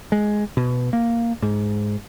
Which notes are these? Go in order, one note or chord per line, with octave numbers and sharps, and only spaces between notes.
G#3
B2
A#3
G#2